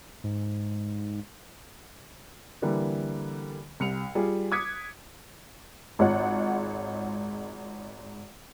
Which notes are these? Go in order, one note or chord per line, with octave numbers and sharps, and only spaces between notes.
G#2
D3 E3 G3 A#3
C2 C#7 F7
G3 F4 G#4
D6 D#6 F#6 G#6 B6 C#7
G#1 G#3 F4 C#5 F#5